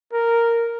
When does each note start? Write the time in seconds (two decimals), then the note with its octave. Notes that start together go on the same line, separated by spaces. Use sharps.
0.13 A#4